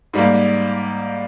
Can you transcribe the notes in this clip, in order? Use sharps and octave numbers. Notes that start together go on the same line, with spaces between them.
G#2 G3 A#3